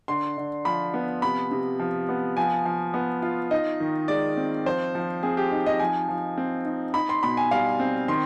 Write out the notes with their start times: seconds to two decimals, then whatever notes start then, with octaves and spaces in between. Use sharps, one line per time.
0.08 D3 C6
0.37 D3
0.65 F3 B5
0.94 B3
1.22 C3 B5
1.51 C3
1.79 F3
2.09 B3
2.37 F3 G#5
2.65 F3
2.94 B3
3.22 F4
3.51 D#4 D#5
3.80 D#3
4.08 G#3 D5
4.37 C4
4.66 F3 C5
4.95 F3
5.23 C4 G#4
5.37 G4
5.52 D#4
5.66 D#5
5.80 F3 G#5
6.09 F3
6.38 C4
6.65 D#4
6.94 D#4 B5
7.09 C6
7.23 B2 B5
7.37 G#5
7.51 G3 F5
7.80 C4
8.08 D#3 C6